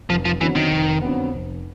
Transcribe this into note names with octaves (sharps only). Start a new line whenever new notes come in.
F1 F3
F3
F2 D3 E3 F#3 B3
D#3
F1
F2 D3 F#3 B3
F1